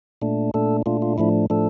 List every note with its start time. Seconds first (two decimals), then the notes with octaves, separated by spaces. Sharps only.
0.22 A#2 A3 D4
0.54 A#2 A3 D4 A4
0.86 A#2 A3 D4 F4
1.02 F4
1.18 A2 F3 A3 D4 E4
1.50 A2 F3 A3 D4 A4